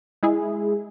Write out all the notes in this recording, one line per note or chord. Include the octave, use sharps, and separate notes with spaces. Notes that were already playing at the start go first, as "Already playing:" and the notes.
G#3 E4 G#4